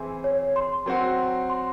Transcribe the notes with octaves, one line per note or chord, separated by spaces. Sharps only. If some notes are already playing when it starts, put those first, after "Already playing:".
Already playing: E3 C4 E4 G#4
C#5
C6
F#3 C4 F#4
C6